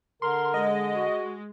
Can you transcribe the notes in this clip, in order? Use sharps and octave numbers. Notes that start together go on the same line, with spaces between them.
D3 A#4 C6
G#3 D#5
F#4